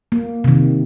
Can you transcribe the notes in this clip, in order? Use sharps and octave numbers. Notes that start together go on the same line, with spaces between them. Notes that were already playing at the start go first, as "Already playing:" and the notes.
A#3
C3 D#3